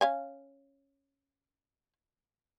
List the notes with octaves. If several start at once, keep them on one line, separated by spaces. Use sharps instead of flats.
C#4 F5 G#5